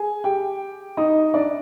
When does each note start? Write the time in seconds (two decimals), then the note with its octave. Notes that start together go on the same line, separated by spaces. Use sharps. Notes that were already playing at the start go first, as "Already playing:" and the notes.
Already playing: G#4 G#5
0.24 G4 G5
0.97 D#4 D#5
1.34 D4 D5